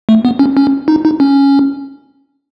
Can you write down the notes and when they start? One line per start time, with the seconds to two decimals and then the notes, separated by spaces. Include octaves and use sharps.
0.09 A3
0.25 B3
0.39 C#4
0.57 C#4
0.88 D#4
1.05 D#4
1.20 C#4